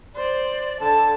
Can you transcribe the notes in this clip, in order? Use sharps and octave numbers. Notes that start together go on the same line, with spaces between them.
C5 D5
D3 A5